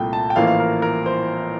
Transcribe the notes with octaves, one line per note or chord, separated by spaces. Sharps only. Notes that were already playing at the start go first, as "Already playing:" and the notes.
Already playing: C2 A#2 A3 G5
A5
G5
A1 A2 F3 A#3 F5
F5
A#4
A#4
C5